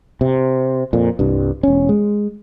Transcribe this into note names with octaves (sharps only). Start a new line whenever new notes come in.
C3
F2 A#2
C2 G2
E1 C#4
G#3